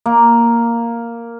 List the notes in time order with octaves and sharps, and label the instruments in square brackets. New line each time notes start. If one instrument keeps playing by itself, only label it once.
[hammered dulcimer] A#3